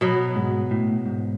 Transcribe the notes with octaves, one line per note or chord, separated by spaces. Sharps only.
B2 F#3 B3
G#2
A2
G#2